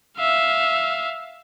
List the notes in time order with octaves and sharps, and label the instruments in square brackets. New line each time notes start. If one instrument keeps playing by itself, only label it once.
[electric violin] E5 F5